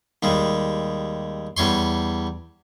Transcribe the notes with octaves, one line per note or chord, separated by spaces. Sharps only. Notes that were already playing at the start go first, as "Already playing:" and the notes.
D#2 G3 G#3
E2 G3 C#5 C6